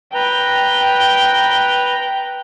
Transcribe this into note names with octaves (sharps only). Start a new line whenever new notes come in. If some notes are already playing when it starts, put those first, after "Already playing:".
B4 G5 A#5